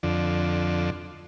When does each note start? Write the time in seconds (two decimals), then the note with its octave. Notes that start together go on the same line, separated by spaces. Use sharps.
0.03 F2 D3